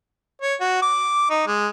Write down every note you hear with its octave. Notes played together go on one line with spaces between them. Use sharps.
C#5
F#4
D6
D#4
G#3